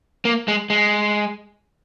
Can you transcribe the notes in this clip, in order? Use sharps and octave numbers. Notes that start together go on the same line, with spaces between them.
A#3
G#3
G#3